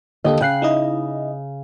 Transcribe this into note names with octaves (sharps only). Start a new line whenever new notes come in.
D#2 D3 G4 A4 D#5
C#3 G5 F#6 C7
D#4 E4 D#5